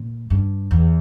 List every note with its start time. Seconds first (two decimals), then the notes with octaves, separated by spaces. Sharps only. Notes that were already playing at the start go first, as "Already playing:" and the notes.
Already playing: A#2
0.30 G2
0.71 E2